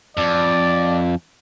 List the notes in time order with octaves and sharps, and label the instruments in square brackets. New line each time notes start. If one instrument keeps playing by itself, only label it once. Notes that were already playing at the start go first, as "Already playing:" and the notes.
[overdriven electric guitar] F2 [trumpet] D5